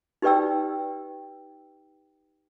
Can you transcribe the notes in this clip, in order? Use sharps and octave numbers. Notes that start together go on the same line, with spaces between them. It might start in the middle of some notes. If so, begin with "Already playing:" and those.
D#4 G4 B4 D5 G5 E6